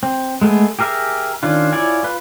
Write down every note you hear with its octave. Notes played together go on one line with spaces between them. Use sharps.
C4
G#3 A3 B3 G#4
G4 G#4 A#4 B4 E5
D#3 C#4 D4 F4
E4 F4 C#5 D5 G#5
F4 B4